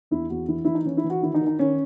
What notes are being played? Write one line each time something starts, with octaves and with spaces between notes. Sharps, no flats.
E2 E4
E2 F#4
E3 E4
E3 E4
D#4
E3 C#4
E4
E3
F#4
D#3 E4
D#4
D#3
D#4
D#3 C#4